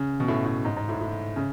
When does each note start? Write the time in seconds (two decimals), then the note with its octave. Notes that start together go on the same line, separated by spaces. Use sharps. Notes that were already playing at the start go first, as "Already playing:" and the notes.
Already playing: C#3
0.20 B2
0.28 A2
0.46 A2
0.65 G#2
0.76 G#2
0.89 A2
1.01 A2
1.36 C#3